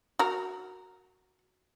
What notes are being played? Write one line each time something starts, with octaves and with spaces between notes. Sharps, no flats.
F#4 A#4